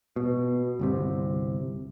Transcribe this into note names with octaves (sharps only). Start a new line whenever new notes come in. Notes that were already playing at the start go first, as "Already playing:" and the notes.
B2
G1 C2 C3